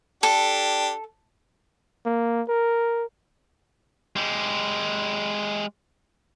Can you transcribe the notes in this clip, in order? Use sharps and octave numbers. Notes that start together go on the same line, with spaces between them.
D4 G4 A4
A#3
A#4
G#3 G4